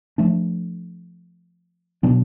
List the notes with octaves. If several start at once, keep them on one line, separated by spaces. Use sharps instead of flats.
F3 A3 D4
B2 F#3 B3 D4